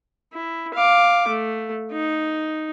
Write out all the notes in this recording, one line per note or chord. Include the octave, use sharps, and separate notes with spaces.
E4
F5 D6
A3
D#4